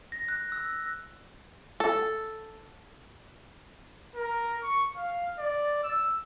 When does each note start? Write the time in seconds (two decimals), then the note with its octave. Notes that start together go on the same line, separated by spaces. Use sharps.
0.12 A#6
0.28 F#6
0.52 E6
1.80 A4
4.15 A#4
4.63 C#6
4.97 F5
5.39 D5
5.83 E6